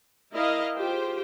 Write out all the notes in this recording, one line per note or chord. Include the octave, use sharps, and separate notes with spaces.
E4 A#4 D#5 F5
F4 G4 G#4 C5 G5